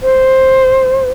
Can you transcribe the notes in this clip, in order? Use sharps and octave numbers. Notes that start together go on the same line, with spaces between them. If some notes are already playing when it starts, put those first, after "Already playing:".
C5